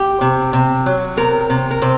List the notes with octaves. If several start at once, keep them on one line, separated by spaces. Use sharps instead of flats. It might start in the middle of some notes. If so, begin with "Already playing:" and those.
Already playing: G4
C3
C3
F#3
C3 A#4
C3
A#4
C3 C5